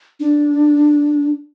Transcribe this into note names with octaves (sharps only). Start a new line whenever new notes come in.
D4